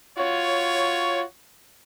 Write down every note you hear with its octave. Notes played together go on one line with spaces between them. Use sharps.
F4 F#4 C#5